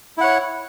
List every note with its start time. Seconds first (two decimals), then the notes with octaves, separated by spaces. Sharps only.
0.18 E4
0.21 F#5
0.24 C#5